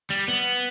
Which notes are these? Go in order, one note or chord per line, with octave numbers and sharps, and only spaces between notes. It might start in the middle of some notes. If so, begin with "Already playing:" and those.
G3
B3